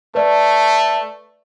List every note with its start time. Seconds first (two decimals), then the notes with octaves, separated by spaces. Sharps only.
0.15 A3 B4 D5